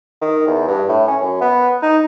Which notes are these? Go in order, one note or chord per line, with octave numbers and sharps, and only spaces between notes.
D#3
E2
G2
A2
C#4
F#2
B3
D#4